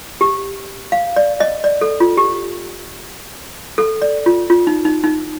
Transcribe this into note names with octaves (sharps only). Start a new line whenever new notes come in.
G4
F5
D5
D#5
D5
A4
F4
G4
A4
D5
F4
F4
D#4
D#4
D#4